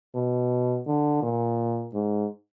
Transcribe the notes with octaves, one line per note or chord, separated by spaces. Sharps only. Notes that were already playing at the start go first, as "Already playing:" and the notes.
B2
D3
A#2
G#2